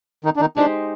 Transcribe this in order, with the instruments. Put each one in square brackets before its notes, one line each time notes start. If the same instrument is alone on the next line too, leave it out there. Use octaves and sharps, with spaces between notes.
[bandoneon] D#3 D#4
D4
D#3 D#4
[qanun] G#3 D#4 G4 C5 [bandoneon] D4